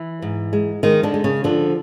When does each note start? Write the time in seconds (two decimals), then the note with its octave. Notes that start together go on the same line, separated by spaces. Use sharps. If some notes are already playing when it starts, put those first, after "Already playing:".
Already playing: E3 E4
0.22 G#2
0.53 G#3
0.83 D#3 G#3 D#4
1.03 D3 D4
1.14 G#3
1.24 C#3 C#4
1.44 D3 F3 D4